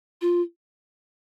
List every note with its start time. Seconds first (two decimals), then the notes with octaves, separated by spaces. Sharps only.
0.21 F4